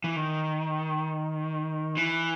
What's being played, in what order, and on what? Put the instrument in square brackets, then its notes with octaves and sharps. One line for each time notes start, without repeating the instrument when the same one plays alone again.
[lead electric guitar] E3
D#3
E3